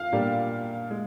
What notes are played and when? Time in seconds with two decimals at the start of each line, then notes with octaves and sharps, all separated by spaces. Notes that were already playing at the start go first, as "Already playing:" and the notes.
Already playing: F5
0.12 A#2 G3 D4 G4 A#4
0.91 G#3